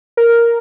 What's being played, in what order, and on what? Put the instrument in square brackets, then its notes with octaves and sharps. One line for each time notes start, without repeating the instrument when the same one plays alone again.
[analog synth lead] A#4